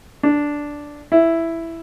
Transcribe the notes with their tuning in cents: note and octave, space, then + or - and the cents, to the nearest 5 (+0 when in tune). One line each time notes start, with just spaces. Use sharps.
D4 -5
E4 +5